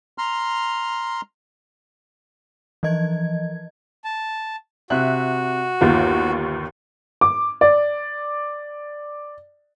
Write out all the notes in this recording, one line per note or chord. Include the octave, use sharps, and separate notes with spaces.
A#5 C6 F6
E3 F3 D#5 G#6
A5
C3 F#4 E5 F#6
G1 D#2 F4
D6
D5